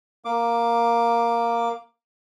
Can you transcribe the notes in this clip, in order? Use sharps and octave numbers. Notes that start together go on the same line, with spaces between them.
A#3 D6